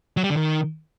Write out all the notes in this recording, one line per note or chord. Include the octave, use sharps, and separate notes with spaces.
F#3
G3
D3
D#3